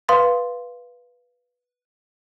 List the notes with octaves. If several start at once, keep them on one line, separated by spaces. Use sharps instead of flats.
B4 F5 C6 D#6 A6